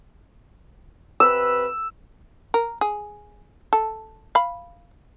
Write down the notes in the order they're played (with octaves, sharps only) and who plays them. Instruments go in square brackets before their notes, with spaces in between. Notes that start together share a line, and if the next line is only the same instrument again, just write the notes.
[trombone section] C3 B4 [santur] E6
[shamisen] A#4
G#4
A4
F5 B5